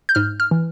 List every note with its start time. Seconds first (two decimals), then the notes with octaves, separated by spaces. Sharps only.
0.09 G6
0.15 G#2 F6
0.40 F6
0.51 E3